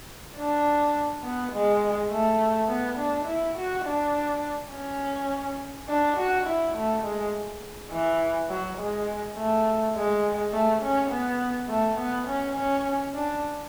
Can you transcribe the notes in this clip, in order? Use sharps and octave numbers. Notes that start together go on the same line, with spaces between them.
D4
B3
G#3
A3
B3
D4
E4
F#4
D4
C#4
D4
F#4
E4
A3
G#3
E3
F#3
G#3
A3
G#3
A3
C#4
B3
A3
B3
C#4
C#4
D4